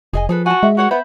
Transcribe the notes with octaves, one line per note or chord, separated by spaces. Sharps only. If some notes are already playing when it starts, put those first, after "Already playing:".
F1 G#4 D#5 G#5
F3 G#4 A4 B4
F#4 G#5 A5
G#3 E5
F#4 A#4 C#5 F#5
B3 C5 E5 B5